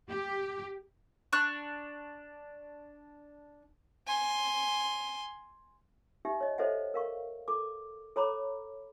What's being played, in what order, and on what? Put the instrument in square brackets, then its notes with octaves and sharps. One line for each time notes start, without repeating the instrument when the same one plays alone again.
[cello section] G4
[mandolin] D4 C#6 F#6
[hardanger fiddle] G#5 C6
[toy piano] D#4 G4 E5
C#5 D#5
A4 C5 C#5 D#5 E5 F#5
A#4 F5 C#6
A4 D6
A4 C#5 A#5 B5 D6